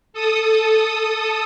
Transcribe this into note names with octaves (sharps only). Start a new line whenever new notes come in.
A4 D#6